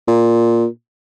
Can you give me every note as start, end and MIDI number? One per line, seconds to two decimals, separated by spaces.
0.08 0.66 46